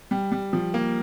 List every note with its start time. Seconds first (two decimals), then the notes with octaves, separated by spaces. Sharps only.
0.11 G3
0.32 G3
0.53 F3
0.74 A#3